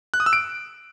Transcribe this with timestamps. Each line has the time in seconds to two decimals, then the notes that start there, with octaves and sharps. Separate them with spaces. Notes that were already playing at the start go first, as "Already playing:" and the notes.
0.14 F#6
0.20 D#6
0.26 E6
0.33 D7